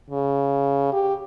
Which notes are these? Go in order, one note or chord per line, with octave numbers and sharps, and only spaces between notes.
C#3
G4